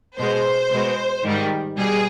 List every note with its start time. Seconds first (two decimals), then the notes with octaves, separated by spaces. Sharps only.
0.18 B2 G#3 C5
0.71 B2 G#3
1.24 G#2 D#3 G3
1.77 B2 G3 G#4